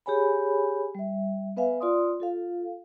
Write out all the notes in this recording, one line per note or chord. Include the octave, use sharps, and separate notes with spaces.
G4 G#4 C#5 G#5 B5
G3 E5
B3 B4 E5 F5 G#5
F4 D5 C6 D#6
F4 A4 F5